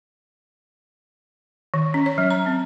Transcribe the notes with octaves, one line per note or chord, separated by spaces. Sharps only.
D#3
C#4
C#5
F#3
A#5
C4